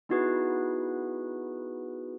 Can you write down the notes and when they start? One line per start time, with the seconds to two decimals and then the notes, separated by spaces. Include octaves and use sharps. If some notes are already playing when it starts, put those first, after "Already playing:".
0.09 B3 D#4 E4 F#4 G#4 B4